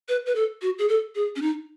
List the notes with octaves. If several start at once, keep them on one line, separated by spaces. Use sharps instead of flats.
B4
B4
A4
F#4
G#4
A4
G#4
C#4
D#4